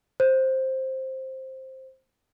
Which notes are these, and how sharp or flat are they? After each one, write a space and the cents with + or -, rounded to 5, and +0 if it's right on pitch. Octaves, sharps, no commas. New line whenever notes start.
C5 +10